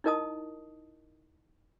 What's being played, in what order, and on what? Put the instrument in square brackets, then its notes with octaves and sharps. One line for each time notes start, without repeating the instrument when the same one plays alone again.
[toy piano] D#4 E4 A#4 D#5 A5 D#6